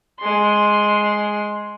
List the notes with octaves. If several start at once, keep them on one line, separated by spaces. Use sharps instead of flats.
G#3 C6